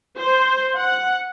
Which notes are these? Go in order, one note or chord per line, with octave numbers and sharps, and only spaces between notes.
C5
F#5